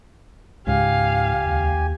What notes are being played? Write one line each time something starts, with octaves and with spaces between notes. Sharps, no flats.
C#2 G#2 G4 F5 G#5
D#2